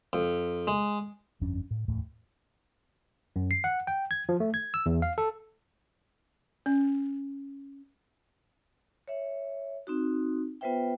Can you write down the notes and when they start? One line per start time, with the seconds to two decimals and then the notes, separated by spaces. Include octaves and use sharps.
0.13 F2
0.67 G#3
1.41 G1 F2 C#4 D4
1.71 A2
1.88 D1 E2 A2 A3
3.36 F#2
3.51 C7
3.64 F#5
3.87 G5
4.11 G#6
4.29 F3
4.40 A3
4.54 G#6
4.74 E6
4.86 E2
5.02 F5
5.18 A4
6.66 C#4
9.08 C#5 E5
9.87 C4 D#4 F#4
10.61 B3 F4 B4 C5 E5 G5